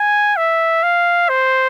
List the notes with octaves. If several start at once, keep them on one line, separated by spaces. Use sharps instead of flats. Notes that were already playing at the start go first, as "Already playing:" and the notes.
Already playing: G#5
E5
F5
C5